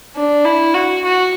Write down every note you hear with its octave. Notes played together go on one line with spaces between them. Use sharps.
D4
E4
F#4
F#4